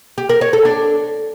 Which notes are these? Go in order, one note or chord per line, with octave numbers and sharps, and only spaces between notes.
G4
A#4
C#5
A4
D4